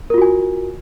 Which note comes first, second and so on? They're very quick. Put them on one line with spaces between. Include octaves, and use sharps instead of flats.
A#4 F4 F#4 G#5